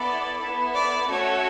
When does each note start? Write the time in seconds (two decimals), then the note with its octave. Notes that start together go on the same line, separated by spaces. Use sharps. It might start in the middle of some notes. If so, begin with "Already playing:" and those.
Already playing: B3 E4 A4 D5
0.40 B3 E4 A4
0.74 D5
1.08 A3 C#4 F#4 A4 C#5